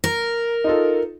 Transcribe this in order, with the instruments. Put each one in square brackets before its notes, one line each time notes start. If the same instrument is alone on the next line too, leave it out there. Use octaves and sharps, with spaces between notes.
[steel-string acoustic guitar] A#4
[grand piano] D#4 F4 A4